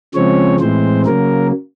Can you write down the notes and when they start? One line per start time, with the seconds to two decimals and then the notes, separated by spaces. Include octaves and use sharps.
0.15 C#3 F3 G#3 C4 C#5
0.60 A2 E3 G#3 C4 C5
1.06 C#3 F#3 A#3 A#4